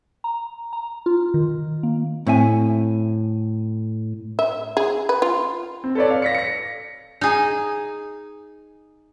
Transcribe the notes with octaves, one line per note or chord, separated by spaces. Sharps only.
A#5
A#5
F4
D#3
A#3
A2 C4 E5 G#5
E5
G#4
B4
F4
C4
A4 B4 C#5 D5
F5
A#6 B6 C#7
A#6 C#7
D#4 G#4